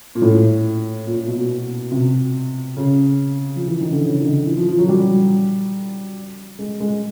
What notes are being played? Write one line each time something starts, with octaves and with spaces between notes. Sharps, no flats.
A#2
A2
A#2
B2
C3
C#3
F3
E3
D#3
D3
C#3
D#3
D3
E3
F3
F3
F#3
G3
G#3
G#3